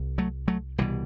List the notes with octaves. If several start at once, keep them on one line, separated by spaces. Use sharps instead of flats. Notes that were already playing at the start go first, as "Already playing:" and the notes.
Already playing: C2
F#3 A3
F#3 A3
C2 B2 E3 G3